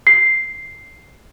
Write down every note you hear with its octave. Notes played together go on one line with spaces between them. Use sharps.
C7